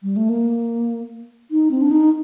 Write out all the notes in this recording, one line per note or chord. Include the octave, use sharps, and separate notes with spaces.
G3
A3
A#3
D#4
C4
D4
D#4